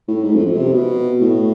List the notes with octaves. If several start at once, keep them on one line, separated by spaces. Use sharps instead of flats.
A2
G#2
F2
F2
C3
B2
A2